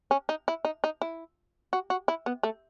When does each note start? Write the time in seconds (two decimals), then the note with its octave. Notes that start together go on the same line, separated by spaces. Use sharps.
0.11 C#4
0.29 D#4
0.48 E4
0.65 D#4
0.84 D#4
1.02 E4
1.73 F#4
1.90 F#4
2.08 E4
2.26 B3
2.43 A3